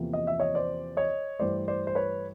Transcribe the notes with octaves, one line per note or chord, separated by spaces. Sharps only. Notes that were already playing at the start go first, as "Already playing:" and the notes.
Already playing: E2 C3 F3 A#3
D#5
E5
C#5 D#5
C5 D5
C#5 D#5
G2 E3 A3 C5 D5
C5 D5
C5
B4 C#5